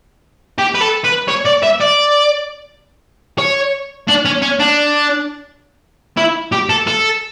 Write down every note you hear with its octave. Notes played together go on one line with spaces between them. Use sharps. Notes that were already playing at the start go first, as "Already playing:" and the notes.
G4
B4
A4
B4
C#5
D5
E5
D5
C#5
D4
C#4
C#4
D4
E4
G4
A4
A4